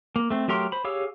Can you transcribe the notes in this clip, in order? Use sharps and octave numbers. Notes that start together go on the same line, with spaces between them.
A#3
A3 C4
F#3 A3 G4 A#4 C6
C5 B5
G4 G#4 C#5 F5 E6